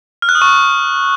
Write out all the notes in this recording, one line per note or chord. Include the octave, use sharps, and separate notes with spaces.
F6
F#6
D#6
C#6